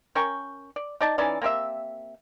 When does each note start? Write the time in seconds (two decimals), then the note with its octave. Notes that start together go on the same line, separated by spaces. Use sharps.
0.15 C#4 A#4 G5 C#6
0.76 D5
1.01 D#4 D5 A5
1.18 E3 C#4 D#4 D5
1.42 A#3 C4 G4 E5